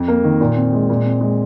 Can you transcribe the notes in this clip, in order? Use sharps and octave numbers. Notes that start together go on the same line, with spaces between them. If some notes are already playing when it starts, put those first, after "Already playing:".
Already playing: F2
A#3
D#3
A#2
C4
G#3
A#2
C4
G#3